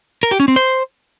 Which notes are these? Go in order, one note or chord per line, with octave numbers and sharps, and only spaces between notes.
A#4
G4
C#4
C4
C5